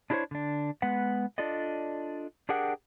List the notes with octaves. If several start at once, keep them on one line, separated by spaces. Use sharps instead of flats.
D4 E4 G4 A4 C5 C#5
D3 D4
G#3 B3 B4 F#5
D4 F4 A4 D5 D#5
D4 G4 G#4 A#4 F#5 G5